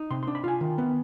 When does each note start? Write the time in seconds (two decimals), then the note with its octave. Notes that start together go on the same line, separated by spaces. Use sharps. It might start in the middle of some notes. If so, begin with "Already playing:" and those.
Already playing: D#4
0.10 C3 C6
0.23 C6
0.27 D4
0.35 B5
0.44 F4 G#5
0.61 D#3
0.78 B3